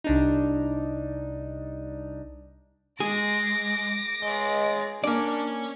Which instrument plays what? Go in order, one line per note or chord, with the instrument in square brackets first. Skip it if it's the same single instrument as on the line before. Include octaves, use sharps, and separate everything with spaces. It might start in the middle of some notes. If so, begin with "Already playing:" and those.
[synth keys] C2 D4 D#4
[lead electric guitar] G#3 [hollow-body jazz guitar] G#4 [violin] D6 A#6
[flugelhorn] G#3 [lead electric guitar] C#5 D#5
[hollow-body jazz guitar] A#3 D5 [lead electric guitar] C#4 G#5 [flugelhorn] D4